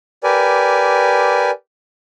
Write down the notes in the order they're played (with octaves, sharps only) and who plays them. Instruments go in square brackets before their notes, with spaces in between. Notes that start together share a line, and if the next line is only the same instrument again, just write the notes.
[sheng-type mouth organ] G4 A#4 B4 D5 G#5